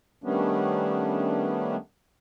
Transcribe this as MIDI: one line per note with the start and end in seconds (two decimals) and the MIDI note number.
0.24 1.76 51
0.24 1.76 55
0.24 1.76 57
0.24 1.76 59
0.24 1.76 61
0.24 1.76 62